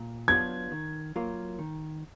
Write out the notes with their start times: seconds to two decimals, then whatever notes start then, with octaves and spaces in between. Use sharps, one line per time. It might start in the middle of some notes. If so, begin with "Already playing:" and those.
Already playing: A#2
0.28 F#3 B3 D4 F4 G#6
0.71 D#3
1.16 F#3 A#3 F4 A#4
1.59 D#3